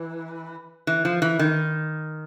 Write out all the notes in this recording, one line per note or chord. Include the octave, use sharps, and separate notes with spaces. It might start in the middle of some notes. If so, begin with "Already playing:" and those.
Already playing: E3
E3
F3
E3
D#3